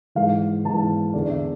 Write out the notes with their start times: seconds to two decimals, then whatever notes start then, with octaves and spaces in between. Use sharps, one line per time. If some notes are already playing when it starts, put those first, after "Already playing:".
0.15 G#2 E3 F5
0.65 G#2 E3 A5
1.14 E2 D3 D5
1.26 D5
1.30 E5